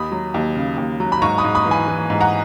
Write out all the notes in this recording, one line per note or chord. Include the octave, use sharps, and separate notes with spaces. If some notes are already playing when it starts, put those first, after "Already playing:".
Already playing: D#2 B5 D#6
F#3
D#2
C#3
D#2
F#3
B5
G#2 A#5 C#6
B5 D#6
G#2
B5 D#6
E3
G#5 B5
E3
G#2
F#5 A#5